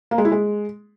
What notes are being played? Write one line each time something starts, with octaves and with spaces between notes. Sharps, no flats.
A#3
G#3
E4
G#3